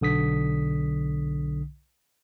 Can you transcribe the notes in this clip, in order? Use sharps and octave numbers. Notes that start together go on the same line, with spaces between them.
B1 D3 D#6 B6